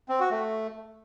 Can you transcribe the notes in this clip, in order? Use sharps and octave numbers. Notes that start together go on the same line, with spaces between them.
C4
F#4
A3